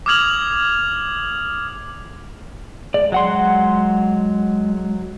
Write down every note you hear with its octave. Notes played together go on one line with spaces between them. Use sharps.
D6 D#6 F6 G#6 F7 F#7
G#3 D5
F#3 F#5 C6